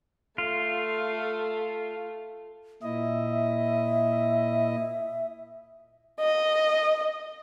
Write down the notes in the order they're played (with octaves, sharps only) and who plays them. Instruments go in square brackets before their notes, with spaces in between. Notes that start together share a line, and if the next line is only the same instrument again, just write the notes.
[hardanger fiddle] A3 [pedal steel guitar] F4
[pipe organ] A#2 E4 D#5 [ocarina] E5
[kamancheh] D#5